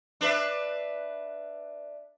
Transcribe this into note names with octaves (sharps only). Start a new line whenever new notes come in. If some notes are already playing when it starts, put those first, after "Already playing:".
D4 B4 E5